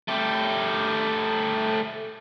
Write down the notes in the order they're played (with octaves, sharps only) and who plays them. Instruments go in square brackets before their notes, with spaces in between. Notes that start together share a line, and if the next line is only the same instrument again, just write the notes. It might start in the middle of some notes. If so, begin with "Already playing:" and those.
[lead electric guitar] A3 G4